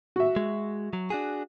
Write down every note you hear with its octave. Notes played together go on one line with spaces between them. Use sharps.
F#4 E5
G#3
F#3
D4 F#4 G#4